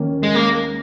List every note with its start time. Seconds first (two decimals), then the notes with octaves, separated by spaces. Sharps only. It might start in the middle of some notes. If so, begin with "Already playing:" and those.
Already playing: D#2 D#3 A#3 C#4
0.23 G#3
0.35 A#3